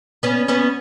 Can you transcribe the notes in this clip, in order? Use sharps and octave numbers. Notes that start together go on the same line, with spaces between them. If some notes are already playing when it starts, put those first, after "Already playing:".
B3 C#4
B3 C#4